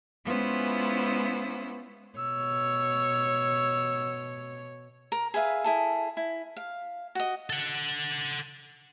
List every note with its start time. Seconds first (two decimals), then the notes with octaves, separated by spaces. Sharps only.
0.25 G#3 B3 C#4 E4 F4 C5
2.18 B2 C#5 E6
5.12 A#4
5.34 G#4 B4 E5 F5
5.64 E4 G#4 A4
6.17 E4
6.57 F5
7.15 F#4 D#5
7.50 A4 F#5